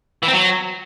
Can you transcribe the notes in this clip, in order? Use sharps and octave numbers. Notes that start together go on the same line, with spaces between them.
E3
C4
F#3